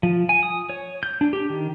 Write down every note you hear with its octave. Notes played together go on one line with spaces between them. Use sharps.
F3
G#5
D#6
C#5
G6
D4
G4
D#3